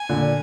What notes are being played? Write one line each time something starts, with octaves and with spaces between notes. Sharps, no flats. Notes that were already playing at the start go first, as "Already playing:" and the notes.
Already playing: G#5
A#2 D3